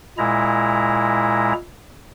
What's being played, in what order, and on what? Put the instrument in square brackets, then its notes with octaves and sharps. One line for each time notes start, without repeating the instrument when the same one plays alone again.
[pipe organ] A#2 G#3 E4 A#5